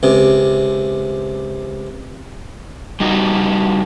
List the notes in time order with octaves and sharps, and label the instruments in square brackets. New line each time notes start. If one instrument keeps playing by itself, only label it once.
[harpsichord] C#2 C3
[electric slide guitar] G3 D#4 F#4